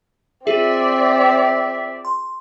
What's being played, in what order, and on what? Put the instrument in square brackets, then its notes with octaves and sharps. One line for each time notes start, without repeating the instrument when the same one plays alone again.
[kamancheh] C4 D5 [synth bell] F4 G#4 [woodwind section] E5
[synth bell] C6